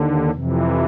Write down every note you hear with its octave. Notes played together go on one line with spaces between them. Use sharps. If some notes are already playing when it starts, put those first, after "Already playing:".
Already playing: D#2 D3
F2 C3 E3